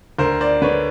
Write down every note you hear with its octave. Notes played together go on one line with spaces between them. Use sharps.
D2 A#4 C5
C5 D5
D3 B4 C#5